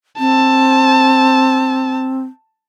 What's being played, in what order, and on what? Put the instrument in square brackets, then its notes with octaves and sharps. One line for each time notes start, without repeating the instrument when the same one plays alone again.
[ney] C4 [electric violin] A5